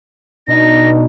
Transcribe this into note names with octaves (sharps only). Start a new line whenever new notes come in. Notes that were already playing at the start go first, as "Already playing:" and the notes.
B2 D4 D#4 A#6